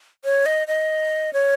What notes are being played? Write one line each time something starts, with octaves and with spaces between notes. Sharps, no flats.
C#5
D#5
D#5
C#5